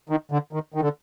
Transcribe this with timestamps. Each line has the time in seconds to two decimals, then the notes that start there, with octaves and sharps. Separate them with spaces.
0.09 D#3
0.31 D3
0.53 D#3
0.74 D#3
0.82 D3